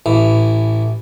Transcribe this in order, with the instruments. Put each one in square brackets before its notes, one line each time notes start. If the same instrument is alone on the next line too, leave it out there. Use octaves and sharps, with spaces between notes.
[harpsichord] A1 E3